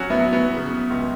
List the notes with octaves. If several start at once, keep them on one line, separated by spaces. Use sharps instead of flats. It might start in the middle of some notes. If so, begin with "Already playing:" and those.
Already playing: F#3 C#4 F#4
B3 E4
F#3
B3
C#3
C#2